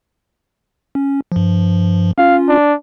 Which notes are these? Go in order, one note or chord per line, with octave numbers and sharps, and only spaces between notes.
C#4
G2 F3
C#4 F4 F5
D4